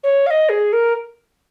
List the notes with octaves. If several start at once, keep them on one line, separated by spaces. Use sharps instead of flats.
C#5
F5
D#5
G#4
A#4